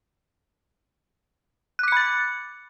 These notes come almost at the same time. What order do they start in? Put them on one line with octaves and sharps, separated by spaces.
F#6 D6 C#7 B5 A6